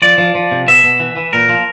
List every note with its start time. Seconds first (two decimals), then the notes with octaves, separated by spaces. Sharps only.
0.02 F3 D5
0.18 F3
0.35 F3
0.51 C3
0.67 B2 E5
0.84 B2
1.00 E3
1.16 E3
1.33 A#2 A#4
1.49 F3